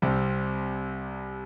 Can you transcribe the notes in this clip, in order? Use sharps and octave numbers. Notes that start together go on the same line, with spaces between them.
C2 C3 G3 C4